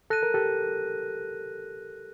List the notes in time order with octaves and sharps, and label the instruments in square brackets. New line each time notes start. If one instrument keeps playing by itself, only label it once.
[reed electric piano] A4 [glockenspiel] F#6 A#6 D#7
[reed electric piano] A#4
G4 A4